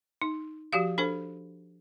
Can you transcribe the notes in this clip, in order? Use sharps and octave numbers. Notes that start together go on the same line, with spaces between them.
D#4
F3 F#4 G4 F5
D4 A4 C5